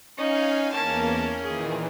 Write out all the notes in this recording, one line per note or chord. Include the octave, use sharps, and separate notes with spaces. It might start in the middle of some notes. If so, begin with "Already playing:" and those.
C#4 D#4 F5 G#5
E2 A#3 C#4 A#4 A5
A#2 D#3 E3 G#4